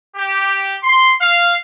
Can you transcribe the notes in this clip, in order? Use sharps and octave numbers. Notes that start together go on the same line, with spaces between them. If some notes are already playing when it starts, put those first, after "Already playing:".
G4
C6
F5